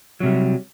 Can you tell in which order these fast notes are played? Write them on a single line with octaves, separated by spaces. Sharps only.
F#3 C3 G3